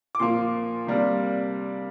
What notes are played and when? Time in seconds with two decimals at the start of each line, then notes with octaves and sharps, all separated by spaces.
0.15 D6
0.20 A#2 F3 A#3 C6
0.87 C3 G3 A#3 D4